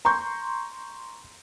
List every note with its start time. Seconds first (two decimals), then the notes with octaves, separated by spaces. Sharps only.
0.05 A#5 C6 C#6 G6